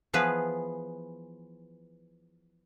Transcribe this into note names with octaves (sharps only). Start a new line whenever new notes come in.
E3 F3 B3 G#4 B4